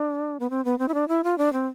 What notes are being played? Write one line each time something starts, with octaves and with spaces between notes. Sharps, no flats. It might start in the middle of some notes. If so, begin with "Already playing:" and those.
Already playing: D4
B3
C4
B3
C4
E4
D4
E4
F4
D4
C4